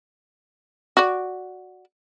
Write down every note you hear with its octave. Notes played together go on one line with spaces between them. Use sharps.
F#4 D5